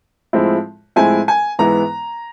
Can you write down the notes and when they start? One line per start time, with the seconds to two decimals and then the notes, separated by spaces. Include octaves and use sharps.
0.33 A2 F3 G#3 C4 E4
0.96 A2 F3 G#3 C4 E4 G#5
1.28 G#5
1.59 G#2 E3 G#3 B3 E4 A#5